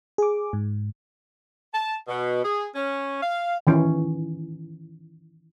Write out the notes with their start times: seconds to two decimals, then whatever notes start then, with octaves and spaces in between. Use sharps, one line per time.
0.18 G#4 D6
0.53 G#2
1.73 A5
2.07 B2
2.43 G#4
2.75 C#4
3.21 F5
3.67 D#3 E3 C#4